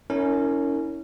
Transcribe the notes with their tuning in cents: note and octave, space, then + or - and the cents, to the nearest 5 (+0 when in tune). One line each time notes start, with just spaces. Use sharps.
C#4 +15 E4 -35 A#4 -25